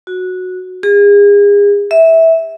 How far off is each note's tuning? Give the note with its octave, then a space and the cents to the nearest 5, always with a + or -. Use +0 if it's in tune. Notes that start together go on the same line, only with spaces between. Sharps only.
F#4 -10
G#4 -35
E5 -15